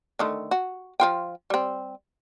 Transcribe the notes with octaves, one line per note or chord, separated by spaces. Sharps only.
D3 D#3 A3
F#4
F3 F4 G5
G3 C4